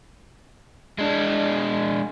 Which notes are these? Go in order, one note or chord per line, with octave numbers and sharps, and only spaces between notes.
G#3 D4